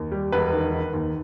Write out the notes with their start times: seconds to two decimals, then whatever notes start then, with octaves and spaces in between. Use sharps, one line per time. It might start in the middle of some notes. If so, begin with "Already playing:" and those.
Already playing: D#2
0.12 G3
0.32 E1 B4
0.53 D#3
0.74 D#3
0.94 D#2